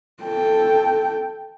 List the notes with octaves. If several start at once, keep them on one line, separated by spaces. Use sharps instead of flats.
A4 G5